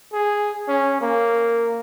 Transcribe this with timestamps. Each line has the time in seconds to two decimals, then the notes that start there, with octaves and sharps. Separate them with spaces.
0.13 G#4
0.68 C#4
1.01 A#3